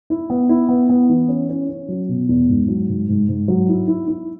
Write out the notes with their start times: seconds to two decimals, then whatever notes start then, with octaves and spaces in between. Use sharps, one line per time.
0.10 E4
0.30 B3
0.49 E4
0.69 B3
0.89 B3
1.09 E3
1.29 C#4
1.49 C#4
1.69 C#4
1.88 F#3
2.09 B2
2.29 E2
2.49 G#2
2.68 F#3
2.89 G#2
3.09 G#2
3.29 G#2
3.48 F#3
3.68 E4
3.88 E4
4.08 E4